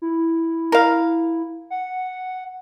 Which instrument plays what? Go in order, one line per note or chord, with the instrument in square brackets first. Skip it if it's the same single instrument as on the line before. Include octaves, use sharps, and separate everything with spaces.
[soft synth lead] E4
[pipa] A#4 F5
[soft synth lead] F#5